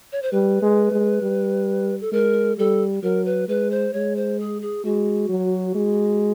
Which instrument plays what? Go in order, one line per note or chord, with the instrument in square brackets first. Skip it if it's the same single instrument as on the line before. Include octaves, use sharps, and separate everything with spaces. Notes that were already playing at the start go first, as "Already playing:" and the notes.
[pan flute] C#5
C5
[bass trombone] G3 [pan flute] B4
[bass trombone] G#3
G#3
G3
[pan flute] A4
[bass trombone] G#3 [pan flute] A#4
[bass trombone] G3 [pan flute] A4
[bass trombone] F#3 [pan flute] A#4
[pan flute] B4
[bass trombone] G#3 [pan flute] B4
[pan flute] C5
[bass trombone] G#3 [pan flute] C#5
[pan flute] C5
G#4
G#4
[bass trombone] G#3 [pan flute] F#4
[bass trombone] F#3
G#3